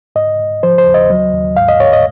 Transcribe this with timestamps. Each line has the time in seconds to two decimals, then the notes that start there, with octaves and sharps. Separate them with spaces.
0.16 G#2 D#5
0.40 G#2
0.63 F3 C5
0.78 C5
0.86 D#2
0.94 D#5
1.10 F#3
1.34 D#2
1.57 G#2 F5
1.69 D#5
1.80 G#2 C#5
1.93 D#5